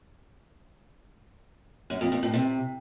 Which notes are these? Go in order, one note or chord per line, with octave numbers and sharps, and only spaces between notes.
F#2
F2
F2
A2
C3